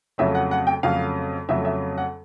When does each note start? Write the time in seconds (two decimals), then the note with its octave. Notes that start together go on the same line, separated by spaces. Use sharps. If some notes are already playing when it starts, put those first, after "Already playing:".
0.18 F2 C#3 F#3 A3 E5
0.35 F#5
0.51 F#5
0.67 G5
0.83 F2 C#3 F#3 A3 F5
1.49 F2 C#3 F#3 A3 E5
1.65 E5
1.98 F#5